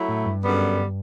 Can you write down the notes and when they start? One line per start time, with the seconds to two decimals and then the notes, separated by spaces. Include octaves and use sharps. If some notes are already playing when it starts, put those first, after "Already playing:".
Already playing: F#3 A3 E4
0.08 A2
0.25 G2
0.42 F#2 D3 G3 B3